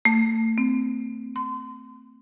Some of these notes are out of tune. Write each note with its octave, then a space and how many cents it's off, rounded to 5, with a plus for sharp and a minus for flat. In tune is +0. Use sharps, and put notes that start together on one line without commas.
A3 +35
C4 -10
C6 -30